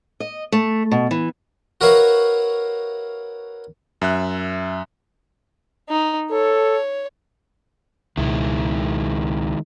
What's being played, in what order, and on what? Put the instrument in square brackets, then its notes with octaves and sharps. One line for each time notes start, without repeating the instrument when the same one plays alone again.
[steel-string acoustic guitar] D#5
A3
B2
E3
[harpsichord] F#4 A#4 B4 C#5 E5 F5
[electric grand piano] F#2 E5 F#6
[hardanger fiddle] D#4
[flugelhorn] A4 [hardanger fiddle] C#5
[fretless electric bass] C#2 B2 [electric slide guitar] D#3 G#3 E4